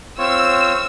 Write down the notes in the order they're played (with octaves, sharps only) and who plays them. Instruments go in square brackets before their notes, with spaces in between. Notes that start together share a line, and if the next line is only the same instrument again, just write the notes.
[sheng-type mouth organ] C4 F4 C#5 [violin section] E6